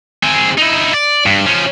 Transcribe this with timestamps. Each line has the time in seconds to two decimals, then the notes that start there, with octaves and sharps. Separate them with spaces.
0.23 C4 G#4
0.58 D#4 E4
0.94 D5
1.26 G2
1.46 F3 C#4